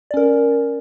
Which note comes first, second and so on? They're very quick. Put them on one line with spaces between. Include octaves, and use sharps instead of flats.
D5 C#4 A#4